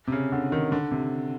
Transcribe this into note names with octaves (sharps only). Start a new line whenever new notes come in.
C3
C#3
D3
D#3
D3
C3